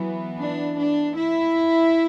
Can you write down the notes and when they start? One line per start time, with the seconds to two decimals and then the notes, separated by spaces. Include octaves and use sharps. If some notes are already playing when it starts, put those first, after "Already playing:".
Already playing: E3 F#3 B3
0.40 D4
0.77 D4
1.16 E4